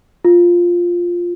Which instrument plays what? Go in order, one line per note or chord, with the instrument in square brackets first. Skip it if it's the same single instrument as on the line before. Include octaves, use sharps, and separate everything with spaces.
[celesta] F4